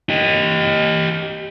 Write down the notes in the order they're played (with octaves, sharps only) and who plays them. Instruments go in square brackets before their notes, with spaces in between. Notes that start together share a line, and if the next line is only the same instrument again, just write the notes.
[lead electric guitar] G4 D#5